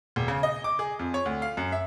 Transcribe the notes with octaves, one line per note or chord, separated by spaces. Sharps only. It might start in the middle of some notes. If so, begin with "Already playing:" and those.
E1
C#3
D#5
D6
G#4
F2
C#5
D2
F5
F#2
E5